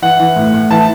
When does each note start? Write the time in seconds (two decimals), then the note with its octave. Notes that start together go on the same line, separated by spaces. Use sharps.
0.02 E3 F#5
0.19 E3
0.36 A2
0.54 A2
0.71 E3 A5